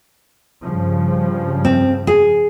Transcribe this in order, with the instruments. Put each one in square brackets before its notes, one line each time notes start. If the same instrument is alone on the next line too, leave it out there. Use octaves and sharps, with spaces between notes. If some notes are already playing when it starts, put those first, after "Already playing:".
[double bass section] G2 C#3 F3
[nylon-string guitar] C4
G#4